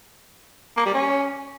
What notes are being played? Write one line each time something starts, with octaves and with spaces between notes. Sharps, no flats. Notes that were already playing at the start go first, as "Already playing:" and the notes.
A#3
G3
C#4